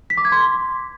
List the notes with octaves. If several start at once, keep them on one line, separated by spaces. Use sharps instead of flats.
B6
D6
G#6
C6